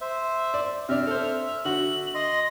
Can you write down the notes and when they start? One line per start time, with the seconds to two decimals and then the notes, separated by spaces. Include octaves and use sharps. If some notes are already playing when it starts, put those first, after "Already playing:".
0.01 C5 E5
0.54 D5
0.89 C3 D4 E5 F6
1.07 A4 C5
1.65 D3 F#4 F#7
2.14 D#5 C6 A#6